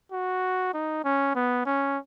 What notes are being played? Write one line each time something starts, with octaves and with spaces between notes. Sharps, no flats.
F#4
D#4
C#4
B3
C#4